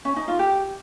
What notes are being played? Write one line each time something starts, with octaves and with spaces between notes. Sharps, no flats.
C#4
D#4
F4
G4